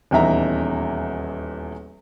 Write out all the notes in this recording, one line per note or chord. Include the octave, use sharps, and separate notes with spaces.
D#1 E2 D#4 E5 A#5